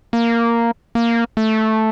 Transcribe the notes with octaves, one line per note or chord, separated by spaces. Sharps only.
A#3
A#3
A3